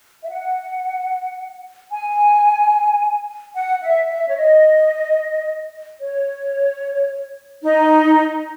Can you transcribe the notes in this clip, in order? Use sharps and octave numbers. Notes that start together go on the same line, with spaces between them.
E5
F#5
G#5
F#5
E5
E5
C#5
D#5
C#5
D#4